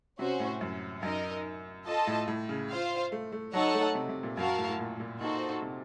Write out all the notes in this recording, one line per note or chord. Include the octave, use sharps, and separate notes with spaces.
C3 C#4 F#4 C5
A2
F#2
F#2 D#4 A#4 D#5
F4 A4 D#5 A5
A2
A2
C#3
F4 C5 F5
A3
A3
F#3 D#4 A4 C#5 F#5 A5
A3
C3
C3
A#2
F#2 F#4 A#4 F5 A5
A2
A2
A#2
A#2
A#2 D#4 F#4 A4 C5
C3